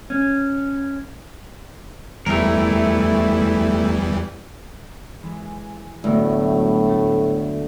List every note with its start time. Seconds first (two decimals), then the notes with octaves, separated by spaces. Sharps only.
0.10 C#4
2.26 E2 E3 G3 A3 E4 A#4
5.23 E3 G#3
6.04 D2 A2 F#3 B3
6.89 A3 F#4